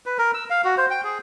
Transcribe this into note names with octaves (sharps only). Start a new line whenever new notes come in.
B4
A#4
E6
F5
F#4
C5
G5
G#4